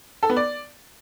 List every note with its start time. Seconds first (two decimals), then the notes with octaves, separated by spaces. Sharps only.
0.23 A4
0.30 B3
0.36 D5